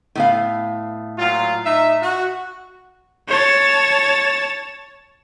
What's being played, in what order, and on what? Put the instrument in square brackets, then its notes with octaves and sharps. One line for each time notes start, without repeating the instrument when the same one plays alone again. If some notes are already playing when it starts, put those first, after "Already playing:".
[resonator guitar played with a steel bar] A2 B3 F5
[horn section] A#2 F#3 F4
D#4 E5
F#4
[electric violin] C#5 A5